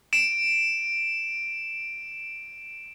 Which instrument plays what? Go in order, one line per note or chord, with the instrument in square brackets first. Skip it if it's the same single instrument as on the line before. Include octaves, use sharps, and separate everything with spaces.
[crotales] D7 E7